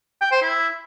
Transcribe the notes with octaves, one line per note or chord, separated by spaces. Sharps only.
G5
C5
E4